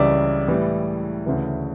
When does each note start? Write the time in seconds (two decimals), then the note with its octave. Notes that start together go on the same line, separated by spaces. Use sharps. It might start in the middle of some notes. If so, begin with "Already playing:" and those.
Already playing: C#2 C#3 E3 G3 D5 E5
0.48 A2 E3 G3
1.26 D2 C#3 E3